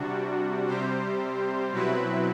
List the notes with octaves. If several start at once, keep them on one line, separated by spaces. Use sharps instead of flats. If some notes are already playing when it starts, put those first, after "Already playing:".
Already playing: C3 G3 D4 F#4
C3 G3 C4 G4 C5
B2 F#3 C4 E4 B4